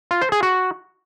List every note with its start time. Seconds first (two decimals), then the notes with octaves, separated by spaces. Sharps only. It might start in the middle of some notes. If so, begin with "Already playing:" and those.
0.11 F4
0.21 C5
0.32 G#4
0.43 F#4